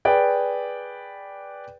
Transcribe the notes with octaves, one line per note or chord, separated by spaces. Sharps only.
G#4 B4 D5 G5